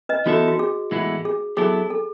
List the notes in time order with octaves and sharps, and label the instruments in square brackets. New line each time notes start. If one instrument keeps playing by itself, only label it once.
[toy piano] B4 D#5
[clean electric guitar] E3 B3 D#4 A4 E5 [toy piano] F#4
[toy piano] F#4
G#4
[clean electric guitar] A2 E3 G#3 B3 E4
[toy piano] G#4
[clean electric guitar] F#3 B3 E4 A4 [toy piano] G#4
[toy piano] A4